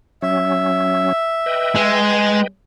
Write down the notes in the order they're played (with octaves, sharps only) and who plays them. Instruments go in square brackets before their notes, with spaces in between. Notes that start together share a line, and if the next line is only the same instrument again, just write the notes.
[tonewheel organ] F#3 C#4 [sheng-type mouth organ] E5
[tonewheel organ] B4 D#5 G5
[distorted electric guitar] G#3